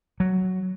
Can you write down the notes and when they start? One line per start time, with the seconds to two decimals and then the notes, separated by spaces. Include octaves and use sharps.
0.20 F#3